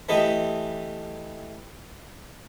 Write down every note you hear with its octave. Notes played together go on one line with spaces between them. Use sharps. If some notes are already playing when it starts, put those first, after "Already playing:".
E3 A3 G4 D#5